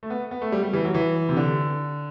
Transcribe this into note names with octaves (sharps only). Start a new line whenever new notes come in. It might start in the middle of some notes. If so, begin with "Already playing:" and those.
A3
B3
B3
A3
G3
G3
E3
F#3
E3
C3
D3